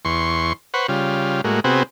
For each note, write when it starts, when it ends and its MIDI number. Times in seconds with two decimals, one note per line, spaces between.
0.05 0.53 40
0.05 0.53 84
0.05 0.53 85
0.74 0.87 71
0.74 0.87 72
0.74 0.87 78
0.74 0.87 85
0.89 1.41 49
0.89 1.41 55
0.89 1.41 65
1.44 1.60 45
1.44 1.60 56
1.44 1.60 58
1.44 1.60 66
1.64 1.83 48
1.64 1.83 59
1.64 1.83 60
1.64 1.83 66
1.64 1.83 68